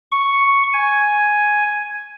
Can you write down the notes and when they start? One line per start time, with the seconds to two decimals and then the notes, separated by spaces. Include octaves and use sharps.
0.12 C#6
0.73 G#5